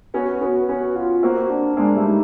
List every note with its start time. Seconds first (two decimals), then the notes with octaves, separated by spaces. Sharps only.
0.14 B3 C#4 F#4
0.41 B3 C#4
0.68 B3 C#4 F#4
0.95 F4
1.23 A#3 C4 F#4
1.50 D4
1.77 G#3 A#3 D4
1.96 G3 A3
2.05 D#4